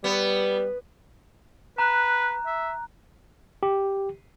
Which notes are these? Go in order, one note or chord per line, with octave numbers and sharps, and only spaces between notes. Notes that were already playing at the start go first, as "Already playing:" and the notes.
G3 B3
B4 A#5 F#6
E5
G4